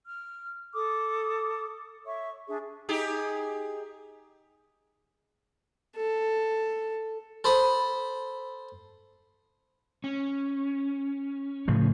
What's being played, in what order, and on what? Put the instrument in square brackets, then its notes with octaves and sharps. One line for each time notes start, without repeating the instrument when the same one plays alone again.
[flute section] F6
A4 D6 D#6
C#5 E5 C#6
D4 G#4 E5
[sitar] D#4 G4 G#4
[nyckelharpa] A4
[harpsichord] A4 C5 B5 D#6
[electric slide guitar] C#4
[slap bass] A2 C#3 F3